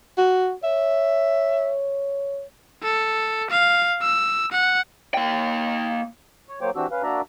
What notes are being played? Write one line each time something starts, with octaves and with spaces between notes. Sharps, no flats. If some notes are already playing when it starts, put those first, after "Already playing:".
F#4
C#5 E5
A4
F5
E6
F#5
A#3 G5
C#5
F#3 A#3 C5 C#5 G5 D6
E3 C4 D4 F#4 G4 E6
C#4 B4 F5
A#3 D4 F#4 D5 E5 A#5